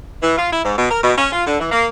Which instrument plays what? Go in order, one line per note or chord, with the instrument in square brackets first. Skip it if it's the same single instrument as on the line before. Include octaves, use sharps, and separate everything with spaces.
[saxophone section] E3
F4
E4
G#2
B2
A#4
B2
C#4
F4
D3
E3
A#3